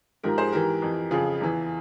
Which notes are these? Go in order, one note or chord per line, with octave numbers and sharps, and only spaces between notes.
G#2 F3 G4 A#4
G#4 C5
G#2 E3 G4 A#4
F2 E3
F2 C#3 F3 F4 G#4
E2 E3